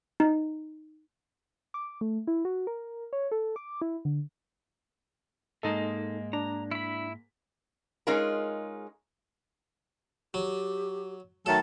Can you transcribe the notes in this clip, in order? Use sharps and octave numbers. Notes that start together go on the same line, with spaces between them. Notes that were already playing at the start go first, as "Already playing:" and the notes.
D#4
D6
A3
E4
F#4
A#4
C#5
A4
D6
E4
D3
G#2 G#3 A#3 D#4 A4 D#5
D4 D5 A#5
E4 B5 B6
G#3 C#4 D#4 F4 G#4 A#4
F#3 G4
D#3 F#3 A3 A4 A5